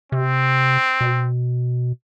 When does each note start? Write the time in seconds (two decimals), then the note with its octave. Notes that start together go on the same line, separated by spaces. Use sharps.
0.12 C3 C4
1.01 B2